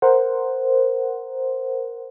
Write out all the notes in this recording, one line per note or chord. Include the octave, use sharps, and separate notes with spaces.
A#4 C5 F#5